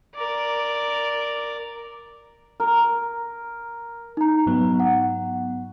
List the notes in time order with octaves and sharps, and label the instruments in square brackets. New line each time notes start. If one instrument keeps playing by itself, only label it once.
[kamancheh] A#4 D5
[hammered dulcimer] A#4
[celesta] D#4 A#5
[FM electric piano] G#2 F#3 B3
[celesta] F#5